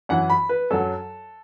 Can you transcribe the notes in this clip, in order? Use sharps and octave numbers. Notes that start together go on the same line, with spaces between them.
F#2 E3 F#5
B5
B4
F#2 F#3 A4